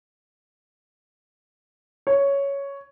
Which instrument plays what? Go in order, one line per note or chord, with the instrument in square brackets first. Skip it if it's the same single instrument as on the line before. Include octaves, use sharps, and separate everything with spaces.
[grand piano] C#5